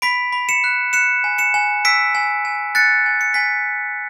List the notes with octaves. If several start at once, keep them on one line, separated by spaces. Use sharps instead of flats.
B5 B6 D7
B5
C#7 E7
F#6
F#6 C#7 E7
G#5
C#7 E7
G#5
E6 B6 D7
G#5
G#5
F#6 A6 C#7
G#5
C#7
G#5 B6